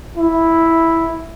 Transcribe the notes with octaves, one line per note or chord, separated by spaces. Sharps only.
E4